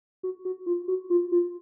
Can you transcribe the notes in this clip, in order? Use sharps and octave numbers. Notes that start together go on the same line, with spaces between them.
F#4
F#4
F4
F#4
F4
F4